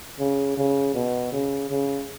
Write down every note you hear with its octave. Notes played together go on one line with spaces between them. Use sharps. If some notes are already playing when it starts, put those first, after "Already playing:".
C#3
C#3
B2
C#3
C#3